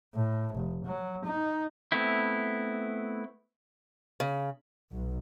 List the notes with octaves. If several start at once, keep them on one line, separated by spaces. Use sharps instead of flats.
A2
F1
F#3
D#4
A3 B3 C4 E4
C#3
B1